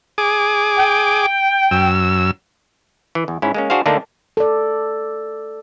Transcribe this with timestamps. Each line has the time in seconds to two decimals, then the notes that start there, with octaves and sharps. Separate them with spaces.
0.18 G#4 D6
0.79 G5
1.71 F#2 E6
3.15 E3
3.28 E2
3.42 G#2 C#4 E4
3.54 G#3 A#3 C#4
3.70 D4 F#4 G#4 C5 F5
3.86 D3 A3 A#3 D4 D#4
4.37 A4 D5